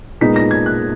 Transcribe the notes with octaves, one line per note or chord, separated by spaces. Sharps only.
A#2 G#3 B3 D#4 B6
A#6
G#6
F#6